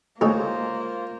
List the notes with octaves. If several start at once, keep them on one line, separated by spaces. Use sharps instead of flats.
D2 G#3 A#3 D#4 F4 G#4 C5 C#5